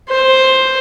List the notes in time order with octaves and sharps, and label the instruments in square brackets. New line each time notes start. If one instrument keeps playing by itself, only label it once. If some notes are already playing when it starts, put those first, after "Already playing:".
[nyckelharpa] C5